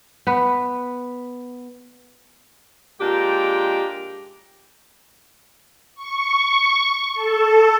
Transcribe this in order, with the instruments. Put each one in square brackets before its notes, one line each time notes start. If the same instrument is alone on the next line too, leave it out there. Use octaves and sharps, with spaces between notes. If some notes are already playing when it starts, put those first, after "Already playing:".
[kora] B3 B4
[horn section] A#2 G#3 D4 G4 G5 A#5
[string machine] C#6
A4